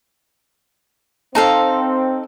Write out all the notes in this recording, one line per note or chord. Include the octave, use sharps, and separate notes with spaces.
C4 D#4 A4 F5